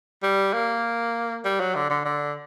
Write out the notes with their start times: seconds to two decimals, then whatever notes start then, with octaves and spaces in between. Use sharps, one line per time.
0.23 G3
0.54 A#3
1.45 G3
1.60 F#3
1.75 D3
1.90 D3
2.05 D3